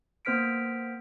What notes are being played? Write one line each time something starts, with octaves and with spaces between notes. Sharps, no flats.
A#3 B3 C5 F6 B6 D7